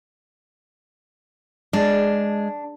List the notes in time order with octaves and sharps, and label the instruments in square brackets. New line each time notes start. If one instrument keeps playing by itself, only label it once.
[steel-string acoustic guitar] G#3 [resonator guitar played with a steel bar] D4